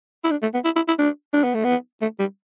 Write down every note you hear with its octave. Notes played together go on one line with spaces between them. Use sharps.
E4
D4
A3
B3
E4
E4
E4
D4
D4
B3
A3
B3
A3
G3